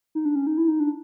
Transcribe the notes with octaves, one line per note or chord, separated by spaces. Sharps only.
D#4
D4
C#4
D#4
E4
D#4
D4